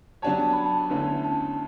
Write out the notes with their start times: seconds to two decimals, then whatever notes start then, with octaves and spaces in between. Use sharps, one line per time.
0.22 F#3 B3 D4 G4 C#5 A5
0.40 A5
0.53 B5
0.66 A5
0.90 E2 D3 A3 C#4 E4
1.24 A5